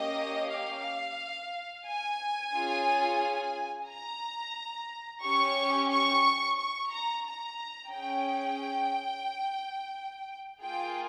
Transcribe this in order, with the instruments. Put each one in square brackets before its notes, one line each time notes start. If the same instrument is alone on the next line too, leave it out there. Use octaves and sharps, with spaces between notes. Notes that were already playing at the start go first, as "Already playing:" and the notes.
Already playing: [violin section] A#3 C#4 G4 D#5
F5
G#5
C#4 F4 G#4
A#5
C#4 G4 C#6
C#6
C#6
A#5
A#5
C#4 G#4 G5
A#3 F4 G#4 G5